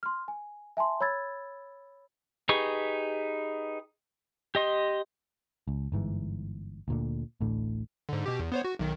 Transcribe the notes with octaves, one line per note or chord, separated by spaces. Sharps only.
C6 F6
G#5
E5 G#5 A5 C6
C#5 B5 E6 G#6 A6
D#4 G4 G#4 B4 C#6
G4 D#5 C6
C#2
G1 G#2 E3
D2 A#2 D3
A1 D2 A2 D3
G#2 D3
B2 G4
E2
B3 C5 C#5
F#4
B1 D#3